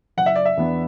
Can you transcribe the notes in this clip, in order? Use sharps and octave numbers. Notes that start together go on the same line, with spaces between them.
F#1 F#5
E5
D5
E5
E2 E3 B3 D4